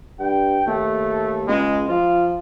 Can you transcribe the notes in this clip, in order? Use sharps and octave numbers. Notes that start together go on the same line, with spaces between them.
G2 G5
D#2 A3
C#2 G#3
F3 F4